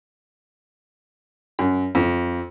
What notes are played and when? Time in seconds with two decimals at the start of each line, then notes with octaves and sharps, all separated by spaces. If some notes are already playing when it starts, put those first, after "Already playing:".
1.59 F#2
1.95 F2